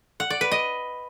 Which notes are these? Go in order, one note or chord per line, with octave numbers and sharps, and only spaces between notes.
F#5
D5
B4
D#5